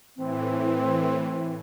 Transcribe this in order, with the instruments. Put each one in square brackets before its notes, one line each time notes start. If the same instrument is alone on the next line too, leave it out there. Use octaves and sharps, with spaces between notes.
[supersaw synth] A2 E3 [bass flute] C4